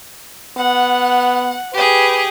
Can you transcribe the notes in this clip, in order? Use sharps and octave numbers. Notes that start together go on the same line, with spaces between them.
B3 F#5
G4 G#4 B4